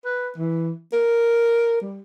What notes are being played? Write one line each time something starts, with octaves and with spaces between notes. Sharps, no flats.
B4
E3
A#4
G3